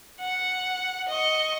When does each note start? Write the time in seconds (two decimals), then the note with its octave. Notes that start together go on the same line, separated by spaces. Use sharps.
0.20 F#5
1.09 D#5 C#6